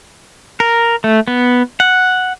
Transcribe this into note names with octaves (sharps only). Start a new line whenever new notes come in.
A#4
A3
B3
F#5